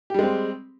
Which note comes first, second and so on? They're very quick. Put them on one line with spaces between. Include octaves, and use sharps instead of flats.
G4 G3 G#3 C4